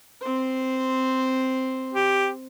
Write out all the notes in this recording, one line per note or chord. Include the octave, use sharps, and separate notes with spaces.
C4 C5
G4